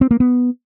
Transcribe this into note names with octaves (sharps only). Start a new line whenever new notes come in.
C4
A#3
B3